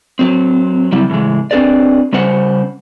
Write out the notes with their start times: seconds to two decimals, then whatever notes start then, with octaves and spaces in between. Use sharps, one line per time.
0.19 F#3 C4
0.92 C#3 F#3 G3 C4 E4
1.10 A2 C#3 E3 G#3
1.51 C4 D4 G#4 B4 D5
2.13 C#3 G3 C#4 C5 F#5